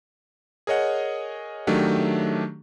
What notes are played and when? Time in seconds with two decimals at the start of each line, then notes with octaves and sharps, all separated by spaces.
0.67 G#4 A#4 C#5 D#5 F#5
1.67 D#3 F#3 A3 D4 G4